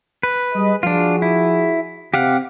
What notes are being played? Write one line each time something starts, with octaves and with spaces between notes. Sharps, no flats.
B4
G3 G#4 D#5
F3 D4 F4 F#4 G#4
E4
C3 G4 F5 F#5